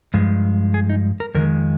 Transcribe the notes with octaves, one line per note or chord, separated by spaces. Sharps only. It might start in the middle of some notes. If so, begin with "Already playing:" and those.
G2 F3 G#3
G#4
D#4
A#4
F2 D#3 G#3 A#4